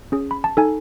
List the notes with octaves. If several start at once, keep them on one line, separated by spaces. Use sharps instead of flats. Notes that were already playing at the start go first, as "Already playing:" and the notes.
C#4 G#4
B5
A5
D#4 A4 G#5